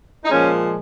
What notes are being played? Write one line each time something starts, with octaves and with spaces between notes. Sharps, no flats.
D#4
A#2 F3 G#3 C#4